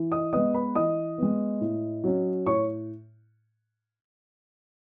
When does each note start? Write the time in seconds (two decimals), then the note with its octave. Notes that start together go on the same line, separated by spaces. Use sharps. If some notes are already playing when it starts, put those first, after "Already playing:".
Already playing: E3
0.12 D#5 D#6
0.33 G#3 B3 D#5 D#6
0.54 B4 B5
0.75 E3 D#5 D#6
1.18 G#3 B3
1.61 A2
2.04 F#3 C#4
2.46 A2 C#5 C#6